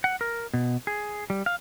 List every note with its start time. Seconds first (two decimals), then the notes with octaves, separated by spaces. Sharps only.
0.04 F#5
0.21 A#4
0.54 B2
0.87 G#4
1.30 G3
1.46 F5